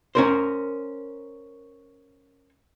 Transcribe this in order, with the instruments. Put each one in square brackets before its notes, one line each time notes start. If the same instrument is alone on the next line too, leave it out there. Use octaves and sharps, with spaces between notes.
[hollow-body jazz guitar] C#4 A#4 C5